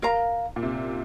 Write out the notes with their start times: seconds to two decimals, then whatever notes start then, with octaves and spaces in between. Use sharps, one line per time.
0.02 A#4 F5 A#5
0.56 A#2
0.63 C3